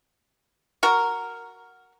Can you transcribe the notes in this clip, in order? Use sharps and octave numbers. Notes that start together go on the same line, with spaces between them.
F#4 A#4